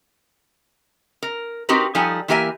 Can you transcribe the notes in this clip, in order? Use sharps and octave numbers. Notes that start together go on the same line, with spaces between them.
A#4
C4 D#4 F#4 G4 A#4 B4
F3 G3 D#4 A4 G#5 A5
E3 A#3 G4 A#4 E5 G#5